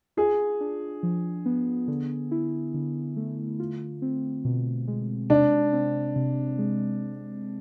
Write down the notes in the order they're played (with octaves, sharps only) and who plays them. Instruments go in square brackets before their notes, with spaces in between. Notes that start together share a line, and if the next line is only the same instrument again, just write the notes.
[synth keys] F4 [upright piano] G#4
[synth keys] D4
F3
B3
D3
E4
D3
A3
F4
C4
B2
G#3
[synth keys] C3 [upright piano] D4
[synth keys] C4
C3
G#3